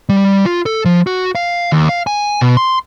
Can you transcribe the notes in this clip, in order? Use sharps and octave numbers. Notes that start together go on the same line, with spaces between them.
G3
F4
A4
F3
F#4
F5
D#2
F5
G#5
B2
C6